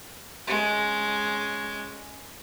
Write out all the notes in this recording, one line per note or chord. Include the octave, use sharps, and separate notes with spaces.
G#3 C#4